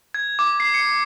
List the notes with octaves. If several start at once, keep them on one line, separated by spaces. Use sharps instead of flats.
G#6
D6
C7
C#7